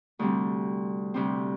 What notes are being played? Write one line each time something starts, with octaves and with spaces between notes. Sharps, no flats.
D2 C3 G3 C4
D2 C3 G3 C4